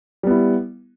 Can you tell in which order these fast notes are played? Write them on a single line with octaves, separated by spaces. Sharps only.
G3 B3 E4